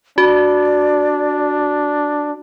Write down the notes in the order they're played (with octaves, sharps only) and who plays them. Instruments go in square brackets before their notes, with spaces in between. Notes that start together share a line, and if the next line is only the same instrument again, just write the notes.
[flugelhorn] D4 [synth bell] F#4 [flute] D5